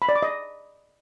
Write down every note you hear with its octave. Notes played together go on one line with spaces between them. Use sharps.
B5
D5
D6
D#5